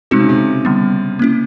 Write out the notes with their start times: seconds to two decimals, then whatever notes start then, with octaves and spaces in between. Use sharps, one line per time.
0.11 C3 G#3 C4 D#4 F#4
0.20 C#3
0.29 C3
0.65 D3 G3 B3
1.19 A#3 C#4 E4